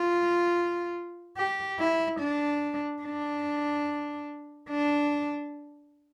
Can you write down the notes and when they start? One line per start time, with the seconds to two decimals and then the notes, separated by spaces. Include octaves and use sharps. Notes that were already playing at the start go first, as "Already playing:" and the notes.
Already playing: F4
1.37 G4
1.79 E4
2.20 D4
3.03 D4
4.69 D4